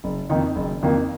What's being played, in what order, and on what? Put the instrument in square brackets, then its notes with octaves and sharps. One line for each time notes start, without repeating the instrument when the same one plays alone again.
[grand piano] F#1
F2 D#3 A#3 D#4
F#1
F2 D#3 A#3 D#4